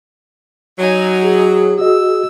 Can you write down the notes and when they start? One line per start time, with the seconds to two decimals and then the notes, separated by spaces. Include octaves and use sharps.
0.79 F#3 D#4 G#5
1.22 G#4
1.79 F#4 D#5 E6